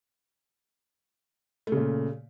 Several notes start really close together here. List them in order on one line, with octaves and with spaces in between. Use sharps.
A3 C#3 A#2